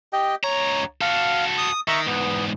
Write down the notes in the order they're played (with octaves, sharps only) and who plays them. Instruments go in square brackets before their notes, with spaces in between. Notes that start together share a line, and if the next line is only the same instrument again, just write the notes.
[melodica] G4 D#5 G5
[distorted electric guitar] C#2 A#5 [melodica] C#5
[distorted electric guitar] F#4 A4 [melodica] F5
[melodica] D#6
[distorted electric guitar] D#3 [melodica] E5 A#5 C#6
[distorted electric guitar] E2 G#2 [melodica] B3